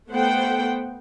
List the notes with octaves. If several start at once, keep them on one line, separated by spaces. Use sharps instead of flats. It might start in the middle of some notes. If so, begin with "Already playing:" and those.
A3 B3 A4 C5 F#5 G5